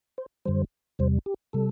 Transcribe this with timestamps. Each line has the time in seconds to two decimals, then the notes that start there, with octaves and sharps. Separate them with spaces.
0.18 C5
0.45 F#2 D3 G3 C5
0.99 E2 C3 G3 C5
1.26 G4
1.53 C3 G3 A4